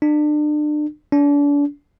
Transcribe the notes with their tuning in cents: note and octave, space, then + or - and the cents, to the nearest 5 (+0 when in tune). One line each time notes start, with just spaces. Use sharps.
D4 +35
D4 -35